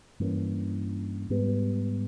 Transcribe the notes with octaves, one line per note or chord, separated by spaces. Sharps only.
G2 E3 A#3 C#4
G#2 G3 B3